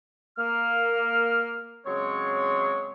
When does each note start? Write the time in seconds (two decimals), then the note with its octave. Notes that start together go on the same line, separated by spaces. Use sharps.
0.38 A#3 F6
1.86 C#3 F#3 G#3 C4 C#5